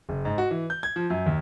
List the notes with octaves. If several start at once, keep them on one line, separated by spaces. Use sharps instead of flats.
F#1
G#2
F#4
E3
G6
G#6
F3
F#2
D#2